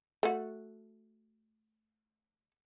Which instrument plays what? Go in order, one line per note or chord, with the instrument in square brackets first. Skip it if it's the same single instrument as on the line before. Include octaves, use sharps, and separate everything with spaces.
[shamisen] A3 F#4